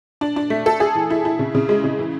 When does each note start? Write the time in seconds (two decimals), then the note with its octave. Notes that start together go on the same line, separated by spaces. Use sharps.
0.21 D4
0.36 D4
0.50 A3
0.66 A4
0.80 G#4
0.95 E3
1.10 E4
1.25 E4
1.39 C#3
1.55 C#3
1.69 G#3
1.84 C#3
1.99 E3